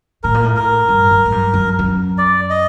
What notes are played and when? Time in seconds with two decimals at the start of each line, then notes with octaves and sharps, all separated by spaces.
0.24 A2 A#4
0.34 A#2
0.44 A2
0.56 A#4
0.89 G2
1.11 F#2
1.26 A2
1.32 G2
1.54 F#2
1.79 F#2
2.18 D5
2.50 D#5